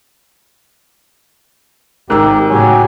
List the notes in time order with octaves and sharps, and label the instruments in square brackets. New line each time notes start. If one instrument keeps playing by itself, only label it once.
[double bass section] G#1 [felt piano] G#2 E6 [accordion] G4 [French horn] A#4
[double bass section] A2 C#3 [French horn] F#3 [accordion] G4 C#5 G#5